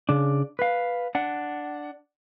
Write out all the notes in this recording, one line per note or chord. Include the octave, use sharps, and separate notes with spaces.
C#3 D4
B4 F5
D4 F#5